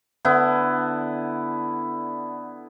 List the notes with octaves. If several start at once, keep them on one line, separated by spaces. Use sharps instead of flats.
D3 B3 E4